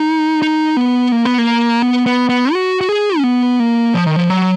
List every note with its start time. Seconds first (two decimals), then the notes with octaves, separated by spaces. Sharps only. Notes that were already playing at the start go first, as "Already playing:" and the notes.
Already playing: D#4
0.42 D#4
0.77 B3
1.12 A#3
1.25 B3
1.39 A#3
1.82 B3
2.06 B3
2.29 B3
2.53 F#4
2.81 F#4
2.89 G#4
3.18 C#4
3.24 B3
3.60 A#3
3.94 F3
4.06 D#3
4.16 F3
4.30 F#3